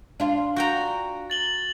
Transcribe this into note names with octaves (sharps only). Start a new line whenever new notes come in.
D4 F4
F#4 G5 A#5
A6 F#7 G7